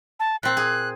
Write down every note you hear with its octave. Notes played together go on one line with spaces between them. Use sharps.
A5
A#2 C4 F#6
G#4